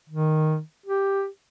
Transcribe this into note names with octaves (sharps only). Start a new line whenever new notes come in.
D#3
G4